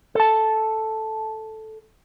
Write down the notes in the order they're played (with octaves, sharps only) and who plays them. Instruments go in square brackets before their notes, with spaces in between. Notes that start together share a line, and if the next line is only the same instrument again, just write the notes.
[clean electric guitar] A4 A5